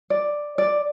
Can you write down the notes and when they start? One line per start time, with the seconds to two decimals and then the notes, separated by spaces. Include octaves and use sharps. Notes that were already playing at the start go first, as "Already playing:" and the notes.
0.10 D5
0.58 D5